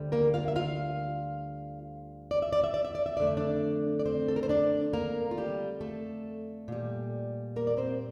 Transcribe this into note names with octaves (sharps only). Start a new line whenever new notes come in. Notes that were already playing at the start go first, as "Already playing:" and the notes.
Already playing: D2 D3 G3
A#3 A#4
F4 F5
E5
F4 F5
D5
E5
D5
E5
D5
E5
D5
E5
F2 D3 A3 D5
E5
D4 D5
D5
C4 C5
A4
A#4
C5
D4 D5
A#3 A#4
F4
G3 G4
A3 A4
A#2 G3
A#3 A#4
D5
C4 C5